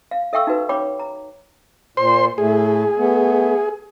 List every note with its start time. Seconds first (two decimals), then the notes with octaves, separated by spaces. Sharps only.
0.11 F5
0.33 A4 E5 F5 G5 C#6 E6
0.47 D#4 F#4 B4
0.69 C#5 G5 B5 D6
0.99 A#5
1.97 A#2 C5 C6
2.38 A2 A3 G#4
2.98 A3 B3